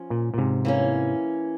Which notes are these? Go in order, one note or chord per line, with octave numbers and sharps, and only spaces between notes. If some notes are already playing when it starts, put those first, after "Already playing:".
Already playing: F3 C#4
A#2
A#2
G#2 C3
E3 A#3 C#4